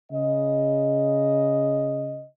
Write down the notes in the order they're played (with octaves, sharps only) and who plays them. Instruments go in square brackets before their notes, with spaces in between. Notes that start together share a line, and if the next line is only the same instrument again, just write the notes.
[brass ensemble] C#3 D#5